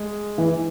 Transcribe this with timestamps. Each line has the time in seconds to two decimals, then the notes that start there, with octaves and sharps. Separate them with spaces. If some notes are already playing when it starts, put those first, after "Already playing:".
Already playing: G#3
0.38 E3